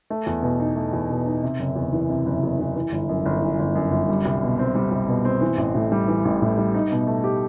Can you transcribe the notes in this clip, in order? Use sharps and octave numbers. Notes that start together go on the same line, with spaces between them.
A3
E2
B2
D#4
A3
E2
B2
D#4
C3
F#1
E2
E3
C3
F#1
E2
E3
E3
G1
F#2
G1
E3
G1
F#2
G1
G3
C2
B2
C4
G3
C2
B2
C4
E3
A1
A2
G3
E3
A1
A2
G3
D#4
B2
A3
G4